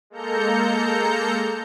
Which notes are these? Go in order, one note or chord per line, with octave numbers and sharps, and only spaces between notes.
G#3 A#3 A4 A#5 G6 C#7